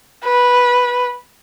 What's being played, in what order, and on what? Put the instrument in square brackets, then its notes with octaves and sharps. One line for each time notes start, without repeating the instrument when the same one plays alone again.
[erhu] B4